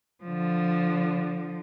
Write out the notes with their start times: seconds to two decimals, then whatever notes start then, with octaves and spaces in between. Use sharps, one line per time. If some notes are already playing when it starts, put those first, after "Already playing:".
0.24 D3 F3